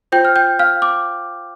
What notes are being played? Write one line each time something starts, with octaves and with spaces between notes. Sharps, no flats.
F4 C5 G5 G6
F6
G5 G6
F5 F6
D6